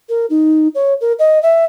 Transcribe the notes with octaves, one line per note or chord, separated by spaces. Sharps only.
A#4
D#4
C#5
A#4
D#5
E5